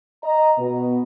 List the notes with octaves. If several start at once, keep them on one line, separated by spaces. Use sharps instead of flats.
D#5 A#5
B2 B3